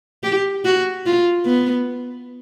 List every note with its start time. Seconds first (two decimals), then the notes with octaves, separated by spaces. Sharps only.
0.23 G4
0.65 F#4
1.06 F4
1.46 B3